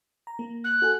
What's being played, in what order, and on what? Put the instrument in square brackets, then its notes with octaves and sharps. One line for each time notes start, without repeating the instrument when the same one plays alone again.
[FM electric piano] A#5
A#3
[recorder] F#6
[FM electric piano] F#4 A4 G#5